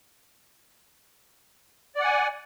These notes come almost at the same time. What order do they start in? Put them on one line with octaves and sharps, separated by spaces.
D5 F#5 G#5